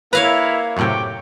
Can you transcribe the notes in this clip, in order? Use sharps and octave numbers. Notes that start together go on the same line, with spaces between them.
A#3 E4 B4 C#5 F5 A#5
F#2 A2 C3 G5 C#6 D6